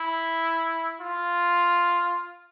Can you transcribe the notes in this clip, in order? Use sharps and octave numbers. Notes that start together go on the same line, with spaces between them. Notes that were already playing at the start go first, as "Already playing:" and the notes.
Already playing: E4
F4